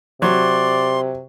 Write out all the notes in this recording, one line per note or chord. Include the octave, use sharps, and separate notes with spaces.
C3 F#3 D5 C6